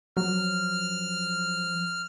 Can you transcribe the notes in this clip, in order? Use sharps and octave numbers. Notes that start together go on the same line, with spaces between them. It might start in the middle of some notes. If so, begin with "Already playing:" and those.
F3 F#3 F6